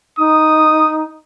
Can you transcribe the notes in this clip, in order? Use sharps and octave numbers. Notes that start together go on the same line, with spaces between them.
D#4 D#6